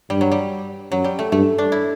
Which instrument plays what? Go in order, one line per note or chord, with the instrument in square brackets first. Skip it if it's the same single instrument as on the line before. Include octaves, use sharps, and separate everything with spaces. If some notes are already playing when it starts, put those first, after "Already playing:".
[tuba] G2 [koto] G3
[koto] F#3
G3
[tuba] F#2 [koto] F#3
[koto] G3
A3
[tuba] G2 [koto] A3
[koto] D4
E4